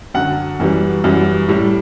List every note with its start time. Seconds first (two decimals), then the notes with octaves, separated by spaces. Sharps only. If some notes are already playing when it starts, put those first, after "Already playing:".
0.14 F#2 D3 F#3 F#5
0.60 F#2 E3 G3
1.04 F#2 E3 G3
1.49 A2 G3